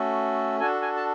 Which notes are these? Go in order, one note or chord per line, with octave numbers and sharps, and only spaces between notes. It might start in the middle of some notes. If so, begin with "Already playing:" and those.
Already playing: A3 C#4 F#4 A4
D4 F#4 A4 G#5
G#5
A5